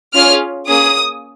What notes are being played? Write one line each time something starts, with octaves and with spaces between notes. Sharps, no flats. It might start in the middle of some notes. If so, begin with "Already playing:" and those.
C#4 F4 G#4 F6
A#3 C#4 G#4 D#6